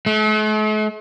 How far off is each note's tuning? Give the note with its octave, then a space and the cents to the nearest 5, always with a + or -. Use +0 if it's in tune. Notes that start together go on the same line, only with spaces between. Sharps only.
A3 -45